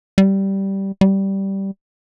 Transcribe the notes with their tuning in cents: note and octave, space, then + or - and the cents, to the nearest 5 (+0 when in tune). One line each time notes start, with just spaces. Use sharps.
G3 -10
G3 -10